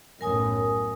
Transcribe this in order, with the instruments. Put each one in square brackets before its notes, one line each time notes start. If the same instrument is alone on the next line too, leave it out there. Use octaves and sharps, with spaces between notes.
[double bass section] B1 F#2 A2 [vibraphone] A#4 G#5 D#6